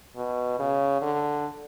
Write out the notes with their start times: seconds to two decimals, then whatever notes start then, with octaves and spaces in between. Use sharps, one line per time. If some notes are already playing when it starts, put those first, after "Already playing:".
0.16 B2
0.59 C#3
1.02 D3